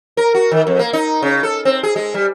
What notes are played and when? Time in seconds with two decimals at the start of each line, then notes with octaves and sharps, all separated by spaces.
0.17 A#4
0.35 F#4
0.51 D#3
0.67 F2
0.79 A#3
0.93 D#4
1.22 C#3
1.43 A4
1.65 C4
1.83 G#4
1.96 G#3
2.14 G3